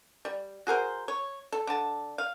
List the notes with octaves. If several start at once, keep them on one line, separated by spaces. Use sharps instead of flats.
G3
F#4 G#4 A#4 C5
C#5
A4
D3 A5
F5